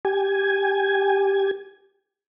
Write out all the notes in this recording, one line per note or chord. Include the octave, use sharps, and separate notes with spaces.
G4 G#5